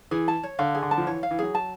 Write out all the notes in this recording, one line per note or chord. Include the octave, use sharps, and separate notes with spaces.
E3 G#4
A5
C#5
D3 F5
G#4
D3
A5
F3
E3 C#5
F5
E3
F#3 G#4
A5